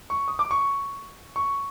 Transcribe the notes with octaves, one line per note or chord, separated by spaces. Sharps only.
C#6
D#6
D6
C#6
C#6